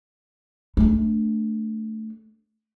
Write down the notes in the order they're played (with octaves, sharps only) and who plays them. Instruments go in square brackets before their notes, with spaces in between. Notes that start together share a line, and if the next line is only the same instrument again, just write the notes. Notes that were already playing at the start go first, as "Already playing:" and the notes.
[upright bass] A3 D4